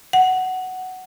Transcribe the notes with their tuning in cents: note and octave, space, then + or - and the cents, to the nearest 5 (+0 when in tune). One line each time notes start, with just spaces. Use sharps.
F#5 +5